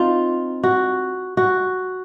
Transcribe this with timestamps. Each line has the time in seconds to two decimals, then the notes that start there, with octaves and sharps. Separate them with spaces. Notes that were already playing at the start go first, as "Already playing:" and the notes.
Already playing: C4 D#4 F4
0.64 F#4
1.37 F#4